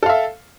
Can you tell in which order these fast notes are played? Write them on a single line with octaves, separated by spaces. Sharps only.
A4 F5 E5